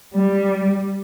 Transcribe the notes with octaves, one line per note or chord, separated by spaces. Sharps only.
G3